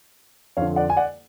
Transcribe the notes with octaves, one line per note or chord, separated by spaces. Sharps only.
F2 D3 C#5 F5
D5 F#5
G#5
D5 F#5